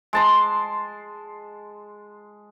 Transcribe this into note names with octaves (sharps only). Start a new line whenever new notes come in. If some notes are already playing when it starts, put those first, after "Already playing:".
G#3 A5 C6